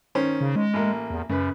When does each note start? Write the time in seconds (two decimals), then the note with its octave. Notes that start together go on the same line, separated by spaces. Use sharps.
0.15 D#3 C#4 C5
0.41 C#3
0.56 G#3
0.74 A1 A#3
1.10 E2
1.29 F#2 C#3 B4